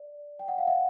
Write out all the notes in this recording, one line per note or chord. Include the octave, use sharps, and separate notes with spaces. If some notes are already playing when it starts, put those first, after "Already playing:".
Already playing: D5
G5
F#5
F5
E5 F#5